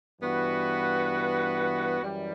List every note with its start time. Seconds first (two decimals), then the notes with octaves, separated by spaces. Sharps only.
0.21 G2 E3 B3 F#4 B4
2.01 F#2 E3 G3